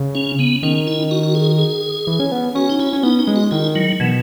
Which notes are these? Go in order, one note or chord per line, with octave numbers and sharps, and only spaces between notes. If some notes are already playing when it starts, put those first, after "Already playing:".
Already playing: C#3
C#4
B3
D#3 C#4
E4
F#4
F#4
G#4
G#4
E3
C#4
B3
C#4 F#4
D#4
E4
C#4
B3 D#4
D#4
G#3
F#4
D#3 E4
F#3
B2 E3